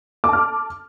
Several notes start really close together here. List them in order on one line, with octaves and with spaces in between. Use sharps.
D6 A5 F6